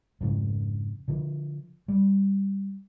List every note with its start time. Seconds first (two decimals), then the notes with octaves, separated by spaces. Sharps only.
0.21 F2 G#2 C#3
1.08 D3 F3
1.88 G3